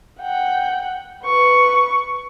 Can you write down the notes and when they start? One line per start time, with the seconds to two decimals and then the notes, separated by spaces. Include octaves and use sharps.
0.21 F#5 G5
1.24 B4 C#6